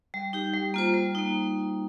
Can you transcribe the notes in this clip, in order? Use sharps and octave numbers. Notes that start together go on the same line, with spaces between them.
G3
D#4 G4
G3
A#3 F4 C5
G3
A#3 D#4